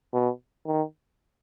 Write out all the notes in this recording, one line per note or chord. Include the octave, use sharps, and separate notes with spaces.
B2
D#3